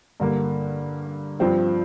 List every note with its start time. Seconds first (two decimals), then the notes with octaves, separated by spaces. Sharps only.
0.20 G2 D3 A#3
1.39 G2 F3 C4 F4